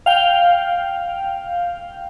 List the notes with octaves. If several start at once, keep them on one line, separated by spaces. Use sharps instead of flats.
F5 G5